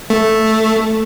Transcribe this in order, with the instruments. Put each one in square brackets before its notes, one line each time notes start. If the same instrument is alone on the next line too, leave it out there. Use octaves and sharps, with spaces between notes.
[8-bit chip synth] A3